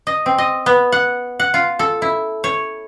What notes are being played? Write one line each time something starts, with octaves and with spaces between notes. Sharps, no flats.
D#5
C4
D#5
B3
F#5
F#5
F4
A4
E4
C#5